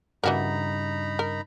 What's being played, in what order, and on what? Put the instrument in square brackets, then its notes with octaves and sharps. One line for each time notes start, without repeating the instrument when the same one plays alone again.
[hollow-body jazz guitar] G2 C#3 [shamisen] E3 F#4 A#4 [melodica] D#4 A#5 B5
[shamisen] A#4